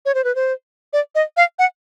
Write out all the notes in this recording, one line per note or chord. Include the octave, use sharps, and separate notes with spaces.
C#5
C5
B4
C5
D5
D#5
F5
F#5